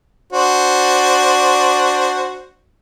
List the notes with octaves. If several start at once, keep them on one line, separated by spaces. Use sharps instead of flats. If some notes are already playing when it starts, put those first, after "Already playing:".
D4 F#4 C5